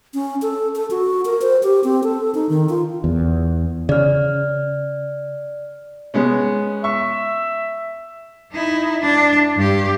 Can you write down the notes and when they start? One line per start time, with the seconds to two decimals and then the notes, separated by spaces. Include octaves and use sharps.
0.14 C#4
0.42 A4
0.76 A4
0.91 F#4
1.25 A#4
1.41 C5
1.63 G4
1.84 C4
2.03 A4
2.35 D#4
2.49 D#3
2.69 F4
3.04 E2
3.89 C#3 D5 F6
6.14 G#3 B3 C#4
6.84 E5 C#6
8.52 D#4 E4
9.01 D4
9.56 G2 G4